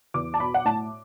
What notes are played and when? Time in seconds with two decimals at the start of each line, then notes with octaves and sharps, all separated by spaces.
0.14 E2 D6
0.34 A5
0.40 B2 B5
0.54 F#5
0.65 A2 A5